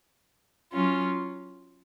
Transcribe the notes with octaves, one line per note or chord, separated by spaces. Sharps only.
F#3 C#4 F4